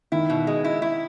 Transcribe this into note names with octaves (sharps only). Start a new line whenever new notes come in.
D#3 E4
B2
G#3
E4
E4